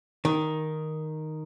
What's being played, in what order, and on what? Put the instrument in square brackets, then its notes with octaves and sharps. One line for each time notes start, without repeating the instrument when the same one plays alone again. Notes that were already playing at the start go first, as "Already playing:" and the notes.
[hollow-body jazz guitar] D#3